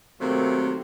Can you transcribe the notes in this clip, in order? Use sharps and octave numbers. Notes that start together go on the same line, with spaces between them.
C3 D#3 F#3 A3 A#3 C4